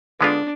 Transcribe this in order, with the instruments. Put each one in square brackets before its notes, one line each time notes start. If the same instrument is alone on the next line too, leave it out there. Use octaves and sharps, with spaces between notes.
[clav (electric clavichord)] D3 G#3 B3 F4 [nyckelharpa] D4